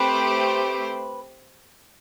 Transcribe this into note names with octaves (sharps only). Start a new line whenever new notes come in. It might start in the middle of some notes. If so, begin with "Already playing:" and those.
Already playing: A3 C4 G4 B4 C5